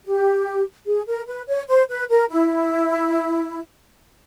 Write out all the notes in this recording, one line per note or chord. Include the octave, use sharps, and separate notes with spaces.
G4
G#4
A#4
B4
C#5
C5
B4
A#4
E4